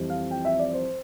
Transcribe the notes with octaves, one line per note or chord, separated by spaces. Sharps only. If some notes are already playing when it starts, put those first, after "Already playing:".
Already playing: F2 E3 G3 C4
F5
G5
E5
D5
C5